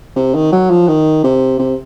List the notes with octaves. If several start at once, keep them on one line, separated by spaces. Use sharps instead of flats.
C3
D#3
F#3
F3
D#3
C3
C3